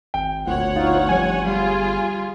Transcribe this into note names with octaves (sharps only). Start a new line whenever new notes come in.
G#1 G5
G1 D2 A#2 C#5 F#5
D#4 F4
F2 G3 G#5 G#6
G3 F4 G#4